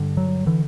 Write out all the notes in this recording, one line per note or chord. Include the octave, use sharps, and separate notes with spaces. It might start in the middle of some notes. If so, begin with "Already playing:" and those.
Already playing: G2 D3
F#3
D3 E3